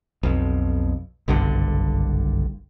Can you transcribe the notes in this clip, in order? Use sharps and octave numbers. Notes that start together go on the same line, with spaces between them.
B1 F2
F#1 B1 G2 D3